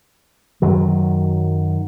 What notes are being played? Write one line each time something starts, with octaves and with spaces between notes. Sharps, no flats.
F#2 D#3 F#3